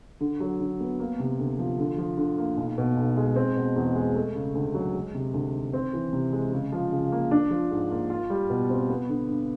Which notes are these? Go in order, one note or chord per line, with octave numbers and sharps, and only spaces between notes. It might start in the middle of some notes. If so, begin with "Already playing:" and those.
D3
F#3
D3
B3
A#3
C3
D2
F3
D3
F3
D3
A#3
B1
B2
B1
G#3
C4
B2
E2
G#3
A3
C#3
D2
F#3
G#3
C3
D2
D#3
C4
E3
C3
G#3
C#3
F3
C#3
A#3
D4
F3
G#2
A#3
F4
G3
B2
C4
B3
D3
G2